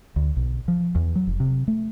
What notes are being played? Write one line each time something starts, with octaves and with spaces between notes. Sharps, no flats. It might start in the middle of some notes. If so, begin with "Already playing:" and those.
D2
B1
F3
E2
F#3
F1
C3
A3